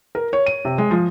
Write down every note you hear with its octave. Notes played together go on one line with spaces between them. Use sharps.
A#4
C#5
D#7
C3
G#3
F3